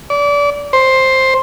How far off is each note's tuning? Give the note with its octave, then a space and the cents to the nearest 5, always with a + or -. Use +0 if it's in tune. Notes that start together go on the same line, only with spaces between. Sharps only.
D5 -30
C5 +10